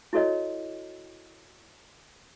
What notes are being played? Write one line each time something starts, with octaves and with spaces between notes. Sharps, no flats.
E4 F#4 A4 C#5 D#5